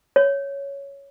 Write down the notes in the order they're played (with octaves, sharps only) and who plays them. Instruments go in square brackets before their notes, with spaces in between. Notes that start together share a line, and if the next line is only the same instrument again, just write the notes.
[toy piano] C#5